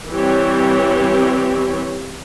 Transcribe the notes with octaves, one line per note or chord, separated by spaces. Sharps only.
E3 G3 C4 G4 C#5